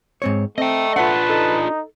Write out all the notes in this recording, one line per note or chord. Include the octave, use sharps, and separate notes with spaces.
G#2 C4 C#5
A3 C4 D#5 G5
D4 F4 B4 F#5 A5
D#4 A4